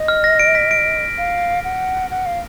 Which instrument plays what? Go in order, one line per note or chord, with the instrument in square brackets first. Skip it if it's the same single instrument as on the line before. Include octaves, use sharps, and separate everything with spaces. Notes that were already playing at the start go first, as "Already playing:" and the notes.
Already playing: [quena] D#5
[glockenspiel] F6
A#6
D7
B6
D7
[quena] F5
F#5
F#5
F5